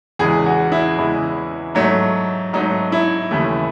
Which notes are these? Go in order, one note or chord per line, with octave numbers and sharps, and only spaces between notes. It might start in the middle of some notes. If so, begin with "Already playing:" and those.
E2 C#3 E3 G#3 G#4
F#4
E4
E2 C#3 E3 G#3
G#2 F#3 A3
G#2 F#3 A3 D#4
E4
D#2 C#3 E3 A3